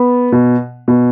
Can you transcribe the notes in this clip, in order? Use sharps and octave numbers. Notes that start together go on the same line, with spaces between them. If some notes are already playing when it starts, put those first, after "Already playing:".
Already playing: B3
B2
B2